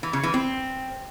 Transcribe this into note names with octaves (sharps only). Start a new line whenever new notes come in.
E3
C#3
E3
C4